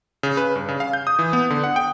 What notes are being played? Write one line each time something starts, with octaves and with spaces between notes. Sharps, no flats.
C#3
B4
G2
C#3
F5
G6
D#6
E3
B3
D3
F#5
G5